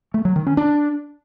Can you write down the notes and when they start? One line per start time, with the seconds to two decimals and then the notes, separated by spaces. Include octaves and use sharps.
0.14 A3
0.25 F#3
0.36 D#3
0.46 C#4
0.57 D4